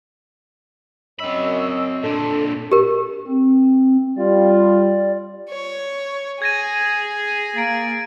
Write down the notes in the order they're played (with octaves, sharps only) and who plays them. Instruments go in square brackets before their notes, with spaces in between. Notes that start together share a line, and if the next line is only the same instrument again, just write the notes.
[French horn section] F#2 C#5 D#5 [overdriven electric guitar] C4 B5 [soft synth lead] E6
[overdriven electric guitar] A#2 C4 [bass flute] D4 [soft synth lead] A4
[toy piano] G4 A#4
[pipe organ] C4
[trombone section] G3 F4 [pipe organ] D5
[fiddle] C#5
[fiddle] G#4 [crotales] G#6 A#6 D#7
[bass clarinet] A#3 [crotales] A6 D7